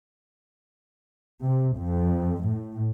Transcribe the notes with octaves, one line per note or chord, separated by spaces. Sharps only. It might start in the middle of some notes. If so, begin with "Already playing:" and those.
C3
F2
A2